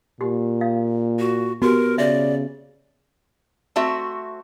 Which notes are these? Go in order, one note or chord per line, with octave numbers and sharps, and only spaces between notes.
A#2 G4
F5
F#4
B3 F#4 G4 A#4
C#3 D5 E5
A3 C4 F#4 E5